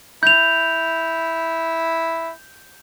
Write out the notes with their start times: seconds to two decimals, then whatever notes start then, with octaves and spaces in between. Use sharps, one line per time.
0.23 E4 G6 F7